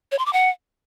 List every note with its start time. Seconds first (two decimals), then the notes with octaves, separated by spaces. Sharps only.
0.12 C#5
0.19 C6
0.26 D6
0.33 F#5